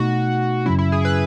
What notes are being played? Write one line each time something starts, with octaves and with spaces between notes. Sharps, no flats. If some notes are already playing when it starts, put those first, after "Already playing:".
Already playing: B2 A3 D#4 F#4
F#2 C#3 F#3 C#4 E4
E4
G#4
B4